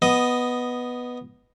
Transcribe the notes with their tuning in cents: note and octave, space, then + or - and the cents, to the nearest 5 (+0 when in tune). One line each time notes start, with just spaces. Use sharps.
B3 +0 D#5 +0